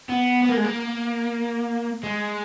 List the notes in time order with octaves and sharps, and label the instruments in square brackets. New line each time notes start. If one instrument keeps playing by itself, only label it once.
[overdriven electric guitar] B3
B3
A#3
G#3
A#3
G#3